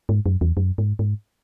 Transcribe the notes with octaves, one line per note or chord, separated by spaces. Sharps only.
G#2
F#2
E2
F#2
G#2
G#2